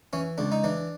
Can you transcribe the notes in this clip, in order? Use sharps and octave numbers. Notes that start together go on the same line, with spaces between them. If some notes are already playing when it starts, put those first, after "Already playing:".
E3 C#4
C#2 D4
D#4
E3 D4